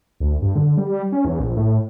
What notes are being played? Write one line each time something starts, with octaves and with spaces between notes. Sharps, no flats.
D2
G2
D3
G3
C#4
E2
A#1
A2